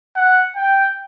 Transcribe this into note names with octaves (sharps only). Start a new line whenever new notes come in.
F#5
G5